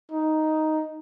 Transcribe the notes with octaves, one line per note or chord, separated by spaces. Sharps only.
D#4